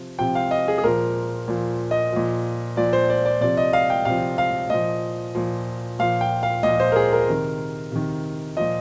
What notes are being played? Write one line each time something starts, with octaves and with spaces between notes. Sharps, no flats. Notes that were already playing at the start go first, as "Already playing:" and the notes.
Already playing: C3 F3
C3 F3 G5
F5
D#5
G#4
G#4
A#2 F3 A#4
A#2 F3
D#5
A#2 F3
A#2 F3 D5
C5
D5
D5
C3 F3 D5
D#5
F5
G5
C3 F3 F5
F5
A#2 F3 D#5
A#2 F3
A#2 F3 F5
G5
F5
A#2 F3 D#5
C5
A#4
G#4
A#4
C3 D#3
C3 D#3
A#2 F3 D#5